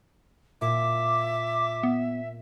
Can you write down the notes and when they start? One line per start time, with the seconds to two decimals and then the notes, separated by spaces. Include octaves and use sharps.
0.61 A#2 E5 D6
1.83 B3